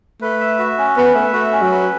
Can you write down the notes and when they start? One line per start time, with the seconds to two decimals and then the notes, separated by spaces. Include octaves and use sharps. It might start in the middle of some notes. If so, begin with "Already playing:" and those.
0.22 A3 B4
0.40 E5
0.59 F#4
0.78 C#4
0.97 B3 B4
1.15 A3 E5
1.33 A3 F#4
1.52 C#4
1.62 F#3
1.71 B4